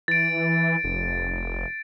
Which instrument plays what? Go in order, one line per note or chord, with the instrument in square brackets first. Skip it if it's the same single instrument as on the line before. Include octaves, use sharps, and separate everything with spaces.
[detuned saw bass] E3 [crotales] A6 D7
[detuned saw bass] F1